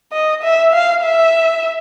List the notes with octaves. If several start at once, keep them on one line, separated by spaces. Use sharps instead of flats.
D#5
E5
F5
E5